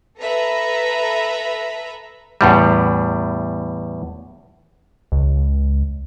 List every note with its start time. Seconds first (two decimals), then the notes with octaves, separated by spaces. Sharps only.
0.19 A4 B4 E5 A#5 B5
2.41 E2 A2 G3
5.12 C#2